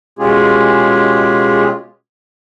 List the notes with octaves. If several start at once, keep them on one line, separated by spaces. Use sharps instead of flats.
B2 G#3 C#4 F4 G4 G#4